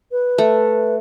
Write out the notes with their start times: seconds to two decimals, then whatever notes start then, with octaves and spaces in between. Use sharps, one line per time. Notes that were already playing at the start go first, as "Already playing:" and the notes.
0.12 B4
0.38 A3